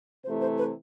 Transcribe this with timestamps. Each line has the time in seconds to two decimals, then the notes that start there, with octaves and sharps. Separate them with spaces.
0.24 C3 E3 A3 C5
0.41 C5
0.58 B4